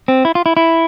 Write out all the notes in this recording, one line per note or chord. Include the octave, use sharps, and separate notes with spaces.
C4
E4
F4
E4
E4